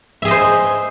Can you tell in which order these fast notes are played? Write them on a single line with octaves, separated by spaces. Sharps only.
E5 G#4 D#5 C5